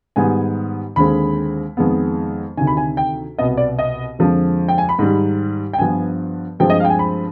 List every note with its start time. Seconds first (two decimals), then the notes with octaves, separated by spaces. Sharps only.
0.16 G#2 D#3 G3 B3 G#5
0.96 D#2 D3 G#3 C4 B5
1.77 F2 D#3 G#3 B3
2.57 D2 C3 D#3 G#5
2.67 B5
2.77 G#5
2.97 G5
3.39 C2 B2 B3 D#5
3.57 D5
3.79 D#5
4.19 F2 D3 F3 G#3
4.68 G5
4.78 G#5
4.89 B5
4.99 G#2 D#3 G3
5.73 G5
5.78 G2 F3 B3 G#5
6.59 G2 F3 G#3 C4 G5
6.70 D#5
6.80 F5
6.85 G5
6.90 G#5
6.99 B5